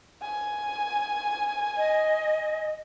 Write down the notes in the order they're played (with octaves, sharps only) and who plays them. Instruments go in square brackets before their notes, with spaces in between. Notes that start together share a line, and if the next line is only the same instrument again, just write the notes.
[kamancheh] G#5
[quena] D#5